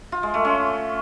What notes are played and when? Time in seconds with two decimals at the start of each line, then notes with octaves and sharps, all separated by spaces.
0.12 F4
0.23 G#3
0.34 A3
0.45 C#4